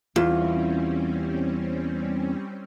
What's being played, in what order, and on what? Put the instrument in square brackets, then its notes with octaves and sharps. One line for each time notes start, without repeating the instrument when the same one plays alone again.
[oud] E2 [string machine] G3 C4 C#4 [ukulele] F4